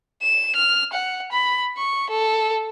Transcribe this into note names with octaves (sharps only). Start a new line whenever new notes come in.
E7
F6
F#5
B5
C#6
A4